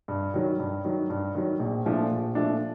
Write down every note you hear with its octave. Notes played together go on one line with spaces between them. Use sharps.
G2
D#3 F#3
G2
D#3 F#3
G2
D#3 F#3
A#1
A#2 F3 A3 D4
A#1
A#2 F3 A3 D4